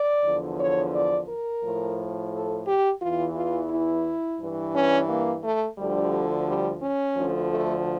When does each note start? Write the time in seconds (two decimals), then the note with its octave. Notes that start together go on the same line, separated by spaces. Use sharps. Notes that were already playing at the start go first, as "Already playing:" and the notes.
Already playing: D5
0.24 E2 D3 F3
0.59 C#5
0.93 D5
1.29 A#4
1.63 A2 F3
2.32 A4
2.67 G4
3.01 E2 E3 F4
3.36 F4
3.71 E4
4.40 G2 E3
4.75 C#4
5.09 A#3
5.44 A3
5.78 D2 D3 F3 G3
6.47 G3
6.82 C#4
7.17 D2 D3 F3
7.51 A3